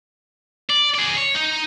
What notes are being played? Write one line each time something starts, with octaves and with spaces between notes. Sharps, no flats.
D5
G#4 D5
C#5
D#4